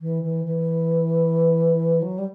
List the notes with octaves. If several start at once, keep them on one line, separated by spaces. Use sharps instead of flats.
E3
E3
E3
F#3
G3